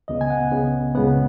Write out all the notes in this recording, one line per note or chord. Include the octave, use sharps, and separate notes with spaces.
C#2 C#3 B3 D#5
G#5
F#5
C#2 C#3 B3
C#2 C#3 B3 F#5